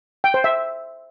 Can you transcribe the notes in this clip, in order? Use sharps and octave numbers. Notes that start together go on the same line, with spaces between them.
G5
C5
E5